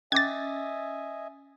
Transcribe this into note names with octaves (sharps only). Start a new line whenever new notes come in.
C#4 D#5 E5 G#5 D6 G#6 A6